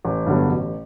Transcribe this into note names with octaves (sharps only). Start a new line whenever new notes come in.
A1
G2 D3 F#3 B3
A1